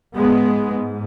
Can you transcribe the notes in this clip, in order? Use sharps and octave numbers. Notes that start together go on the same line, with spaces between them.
G#2 G#3 B3